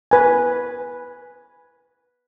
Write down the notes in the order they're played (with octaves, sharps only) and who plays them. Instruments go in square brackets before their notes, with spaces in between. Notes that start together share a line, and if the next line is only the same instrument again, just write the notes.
[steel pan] B4 G#5